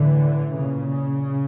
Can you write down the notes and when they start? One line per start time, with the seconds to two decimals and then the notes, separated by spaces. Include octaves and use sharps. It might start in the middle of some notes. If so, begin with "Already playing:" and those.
Already playing: A2 D3 E3
0.56 A#2 C#3